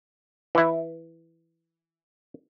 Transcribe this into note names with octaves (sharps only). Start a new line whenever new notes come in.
E3 E4